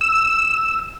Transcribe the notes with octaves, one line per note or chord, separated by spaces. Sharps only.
E6